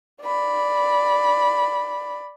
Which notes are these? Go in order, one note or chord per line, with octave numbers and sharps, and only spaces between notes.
D5 B5